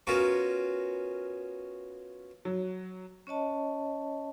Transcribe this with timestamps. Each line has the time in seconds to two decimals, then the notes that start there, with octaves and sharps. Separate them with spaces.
0.07 B3 C#4 F4 F#4 A#4
2.45 F#3
3.27 C#4 C#5 D#5 A5